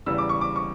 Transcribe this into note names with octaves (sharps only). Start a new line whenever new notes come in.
E2 C#3 E3 G3 E6
D6
C#6
D6
C#6